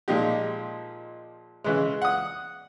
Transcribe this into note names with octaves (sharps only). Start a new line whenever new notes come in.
A#2 F3 G#3 D#4 G4
C#3 E3 G#3
F#5 D#6